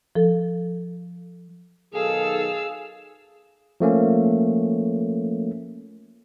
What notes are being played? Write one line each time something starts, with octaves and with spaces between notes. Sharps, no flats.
F3 A4
B1 D#3 G#4 A4 F5 E6
F3 A3 A#3 C#4